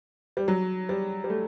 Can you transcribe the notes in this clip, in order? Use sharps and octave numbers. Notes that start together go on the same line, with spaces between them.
G3
F#3
G3
G3
A3